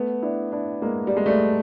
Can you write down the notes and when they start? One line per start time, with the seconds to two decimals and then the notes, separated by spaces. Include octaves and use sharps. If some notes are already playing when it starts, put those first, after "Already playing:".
Already playing: A3 B3
0.23 D4 E4
0.52 D4 E4
0.82 G#3 A#3
1.07 G3
1.17 G#3
1.26 G3 A3